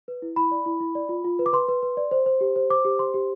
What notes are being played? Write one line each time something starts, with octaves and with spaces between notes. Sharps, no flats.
B4
E4
E4 B5
D5
E4
E4
D5
F4
F4
B4
D6
B4 C6
B4
B4
D5
C5
C5
G4
C5
C5 D6
G4
C5 C6
G4